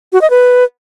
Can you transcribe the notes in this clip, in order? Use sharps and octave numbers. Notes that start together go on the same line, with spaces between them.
F#4
D#5
B4